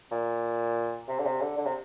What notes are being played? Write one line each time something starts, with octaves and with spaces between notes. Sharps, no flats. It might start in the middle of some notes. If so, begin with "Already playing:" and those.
A#2
C3
D3
C3
D3
D3
C3